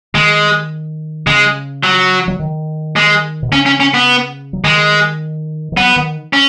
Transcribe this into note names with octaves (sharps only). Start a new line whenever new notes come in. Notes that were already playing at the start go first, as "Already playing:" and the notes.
D#3 G#3
C#3 G#3
F#3
F#3
D#3
G#3
B2
C#3 C#4
C#4
C#4
B3
F#3
D#3 G#3
D#3
F#3 B3
D#3
C#4